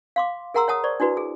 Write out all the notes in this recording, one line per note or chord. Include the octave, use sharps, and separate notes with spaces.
F5 C6 D6
G#4 A#4 F#5 A#5 C6 E6
C#5 F#5 A5 D#6
C5 D5 C#6
D4 E4 F#4 B4
G#4